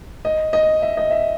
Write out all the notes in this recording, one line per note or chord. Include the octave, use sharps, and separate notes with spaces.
D#5
D#5
E5
D#5
E5